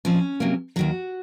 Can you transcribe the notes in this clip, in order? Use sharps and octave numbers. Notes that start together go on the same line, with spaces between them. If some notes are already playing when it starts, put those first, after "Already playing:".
A#2 F3 C4 C#4
C3 F#3 A#3
D#2 D#3 F#3 F#4